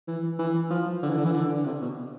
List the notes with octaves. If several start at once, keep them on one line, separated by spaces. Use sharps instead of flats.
E3
E3
F3
D3
E3
D3
E3
D3
D3
C3
B2